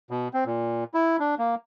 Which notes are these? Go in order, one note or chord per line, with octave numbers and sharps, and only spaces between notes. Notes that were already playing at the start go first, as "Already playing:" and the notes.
B2
C4
A#2
E4
D4
A#3